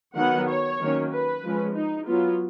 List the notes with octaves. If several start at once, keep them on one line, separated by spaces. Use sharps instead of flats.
D#3 F#3 B3 F#5
C#5
D#3 F#3 A#3 C#4
B4
F3 G#3 C#4
D#4
F#3 B3 F4